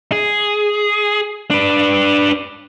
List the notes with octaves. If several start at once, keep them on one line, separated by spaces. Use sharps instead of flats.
G#4
D4 B4